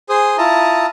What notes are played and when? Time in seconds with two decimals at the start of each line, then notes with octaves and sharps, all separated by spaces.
0.09 G#4 C5 D#6
0.38 E4 F4 A5 A#5 D#6